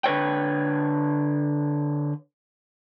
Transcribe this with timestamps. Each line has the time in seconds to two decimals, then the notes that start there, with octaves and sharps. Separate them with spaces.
0.04 D3 B4 C#5 G5